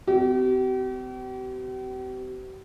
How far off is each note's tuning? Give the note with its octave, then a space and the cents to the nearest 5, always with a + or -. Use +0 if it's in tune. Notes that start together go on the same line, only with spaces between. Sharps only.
C4 -40 G4 -45